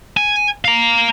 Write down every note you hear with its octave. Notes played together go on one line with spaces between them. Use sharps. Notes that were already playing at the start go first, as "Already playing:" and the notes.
G#5
F5 A#5